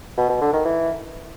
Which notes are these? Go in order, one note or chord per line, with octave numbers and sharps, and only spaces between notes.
B2
B2
D3
D#3
E3